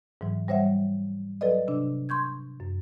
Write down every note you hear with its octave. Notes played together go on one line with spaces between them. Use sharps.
G#2 E3 F#3
G3 C5 C#5 E5 F#5
F#3 A4 B4 D5 D#5
C3 D4
C6 C#6 G6 G#6
F#2